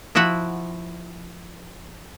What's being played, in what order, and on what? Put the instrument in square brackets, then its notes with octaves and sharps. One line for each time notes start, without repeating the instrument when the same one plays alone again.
[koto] F3 E4 F#4 E5 F#5